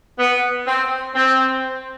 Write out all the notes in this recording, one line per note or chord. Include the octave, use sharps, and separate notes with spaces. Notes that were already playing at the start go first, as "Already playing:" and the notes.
B3
C4
C4